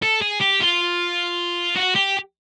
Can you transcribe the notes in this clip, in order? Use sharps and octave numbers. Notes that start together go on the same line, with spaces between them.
A4
G#4
G4
F4
F#4
G4